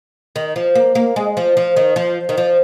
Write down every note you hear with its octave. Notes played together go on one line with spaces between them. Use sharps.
D#3
F3
A#3
A#3
G#3
F3
F3
D#3
F3
D#3
F3